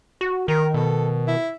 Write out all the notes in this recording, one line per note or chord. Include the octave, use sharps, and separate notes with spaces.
F#4
D#3 A#4
B2 A4
E4